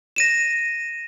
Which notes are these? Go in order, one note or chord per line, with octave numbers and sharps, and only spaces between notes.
A#6 D#7 E7